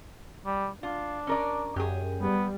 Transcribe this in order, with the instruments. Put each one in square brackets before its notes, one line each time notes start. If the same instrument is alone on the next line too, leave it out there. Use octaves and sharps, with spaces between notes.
[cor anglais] G3
[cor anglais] D4 [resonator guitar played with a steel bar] F4
[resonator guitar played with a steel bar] C#4 A#4 D5
[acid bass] F#2 [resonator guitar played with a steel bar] G4 G#4
[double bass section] G3 [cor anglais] B3